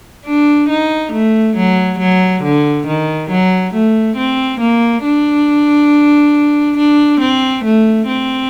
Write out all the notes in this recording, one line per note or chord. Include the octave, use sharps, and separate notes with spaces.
D4
D#4
A3
F#3
F#3
D3
D#3
F#3
A3
C4
A#3
D4
D4
C4
A3
C4